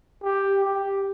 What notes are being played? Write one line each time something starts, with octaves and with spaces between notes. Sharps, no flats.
G4
G4